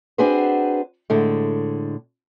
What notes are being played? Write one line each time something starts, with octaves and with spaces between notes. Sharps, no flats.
C4 D4 F#4 G#4 B4 C5
A2 D3 G#3